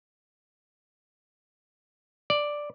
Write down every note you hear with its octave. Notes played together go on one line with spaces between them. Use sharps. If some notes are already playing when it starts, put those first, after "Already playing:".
D5